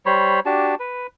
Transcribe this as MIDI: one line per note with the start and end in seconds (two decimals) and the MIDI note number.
0.06 0.40 55
0.06 0.40 72
0.06 0.40 73
0.06 0.40 83
0.46 0.75 62
0.46 0.75 66
0.46 0.75 67
0.46 0.75 81
0.80 1.07 71